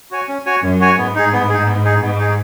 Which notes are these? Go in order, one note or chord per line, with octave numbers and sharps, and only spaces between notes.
F#4 C#5 G#5
C#4
F#4 C#5 G#5
F#2 C#4
F#4 C#5 G#5
G#2 B3
D#4 G#4
B3
D#4 G#4
B3
D#4 G#4
G#2 B3
D#4 G#4